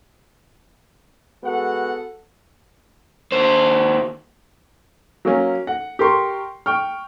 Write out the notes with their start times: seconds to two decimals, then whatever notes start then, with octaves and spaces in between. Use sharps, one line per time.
1.44 G#3 B3 F#4 A4 F#5
3.32 D#2 C5
5.25 F#3 A#3 C#4
5.67 F#5
5.99 G4 A#4 C6 C#6
6.66 G5 C#6 F6